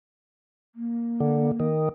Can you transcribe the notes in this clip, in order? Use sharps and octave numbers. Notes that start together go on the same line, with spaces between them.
A#3
D3
D#3